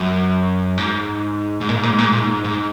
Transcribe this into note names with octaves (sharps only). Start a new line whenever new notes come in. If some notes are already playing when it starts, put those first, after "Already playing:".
Already playing: F#2
G#2
G#2
A#2
G#2
A#2
G#2
A#2
G#2
A#2
G#2
G#2